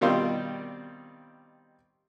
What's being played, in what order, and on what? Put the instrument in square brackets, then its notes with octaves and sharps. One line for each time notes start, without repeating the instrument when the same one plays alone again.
[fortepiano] B2 D#3 G3 C4 F4 G4